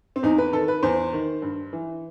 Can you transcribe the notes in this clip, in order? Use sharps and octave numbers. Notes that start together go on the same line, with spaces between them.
C4
E2 D#4
B4
D#3 A4
B4
E2 C5
D#3
G2
E3